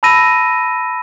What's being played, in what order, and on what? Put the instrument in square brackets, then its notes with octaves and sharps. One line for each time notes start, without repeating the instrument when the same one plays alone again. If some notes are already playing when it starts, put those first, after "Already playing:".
[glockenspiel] A5 B5 E6 A#6 D#7